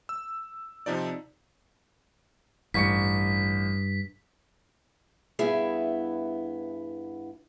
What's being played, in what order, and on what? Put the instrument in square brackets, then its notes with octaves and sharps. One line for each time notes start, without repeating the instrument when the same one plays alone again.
[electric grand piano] E6
C3 F3 D#4 D5
[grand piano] A1 C#6 C#7 [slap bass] G2 [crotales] B6
[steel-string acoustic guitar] G2 B3 E4 G#4 E5